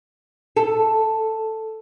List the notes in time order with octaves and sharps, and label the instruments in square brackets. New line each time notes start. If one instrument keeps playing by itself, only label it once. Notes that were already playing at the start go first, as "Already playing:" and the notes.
[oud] A4